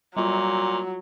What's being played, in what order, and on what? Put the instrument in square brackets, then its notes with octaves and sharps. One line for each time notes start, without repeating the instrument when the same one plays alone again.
[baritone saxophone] A#2 [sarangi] F#3 [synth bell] G3 F4